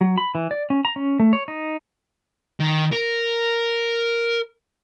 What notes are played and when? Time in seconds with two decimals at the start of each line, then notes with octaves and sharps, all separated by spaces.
0.01 F#3
0.18 B5
0.35 E3
0.51 D5
0.70 C#4
0.85 A#5
0.96 C#4
1.20 A3
1.33 C#5
1.48 D#4
2.60 D#3
2.92 A#4